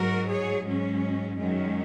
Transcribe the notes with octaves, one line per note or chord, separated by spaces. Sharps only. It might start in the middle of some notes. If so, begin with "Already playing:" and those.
Already playing: G#2 F#3 F#4 A#4
G#4 C#5
G#2 F#3 G#3 C#4
F#2 D#3 F#3 G#3 C#4